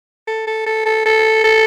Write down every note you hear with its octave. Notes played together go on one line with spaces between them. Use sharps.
A4
A4
A4
A4
A4
A4